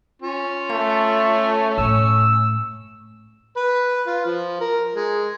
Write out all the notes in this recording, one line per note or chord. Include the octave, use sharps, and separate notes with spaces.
C#4 F4
A3
A2 E6
B4
F4
F3
A#4
G#3